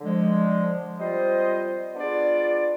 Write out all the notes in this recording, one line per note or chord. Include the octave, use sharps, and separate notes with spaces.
D3 F3 G#3
G3 C4 F4 C5 D#5
B3 D4 F4 G#4 D5